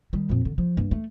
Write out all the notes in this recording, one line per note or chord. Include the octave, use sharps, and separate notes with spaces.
D#3 G3
F2 A#2
D3
F3
G2 A#3
A3